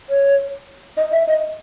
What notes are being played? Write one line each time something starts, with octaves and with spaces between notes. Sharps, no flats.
C#5
D#5
E5
D#5